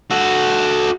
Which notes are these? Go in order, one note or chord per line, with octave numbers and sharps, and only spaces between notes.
F#4 A4